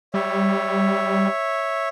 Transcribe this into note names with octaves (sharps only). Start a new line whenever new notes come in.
G3 C#5 E5